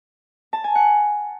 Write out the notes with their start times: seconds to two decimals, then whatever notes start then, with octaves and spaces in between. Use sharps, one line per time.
0.53 A5
0.64 G#5
0.75 F#5